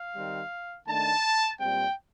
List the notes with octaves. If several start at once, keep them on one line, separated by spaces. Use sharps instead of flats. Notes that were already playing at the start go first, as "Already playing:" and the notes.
Already playing: F5
D#3 G3 C4
D#3 A3 D4 A5
A#2 G3 C4 G5